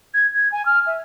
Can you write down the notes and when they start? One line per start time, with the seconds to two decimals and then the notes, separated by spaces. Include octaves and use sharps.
0.14 G#6
0.34 G#6
0.52 G#5
0.66 F6
0.87 E5